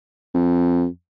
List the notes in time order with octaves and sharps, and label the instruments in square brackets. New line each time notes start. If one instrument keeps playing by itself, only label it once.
[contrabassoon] F2